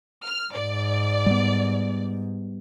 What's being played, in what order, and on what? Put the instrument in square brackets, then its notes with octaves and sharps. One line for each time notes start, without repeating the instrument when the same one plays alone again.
[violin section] F6
[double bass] G#2 [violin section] D5
[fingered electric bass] G3 B3